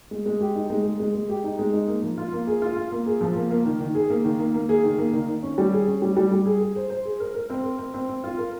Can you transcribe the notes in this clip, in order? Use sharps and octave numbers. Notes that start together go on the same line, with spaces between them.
G#3
G#3
G4
D#4
G#3
G#3
G#3
G#3
G4
D#4
G#3
D#4
A#3
F3
F4
A#3
G#4
F4
F4
A#3
G#4
F3
A#3
A#3
D#3
D#3
G#4
A#3
D#3
A#3
A#3
G#4
D#3
A#3
D#3
D#3
C#4
G3
G#4
C#4
G3
G3
G3
G#4
G#4
C5
C5
G#4
A#4
A#4
C4
A#4
C4
C4
C4
F4
A#4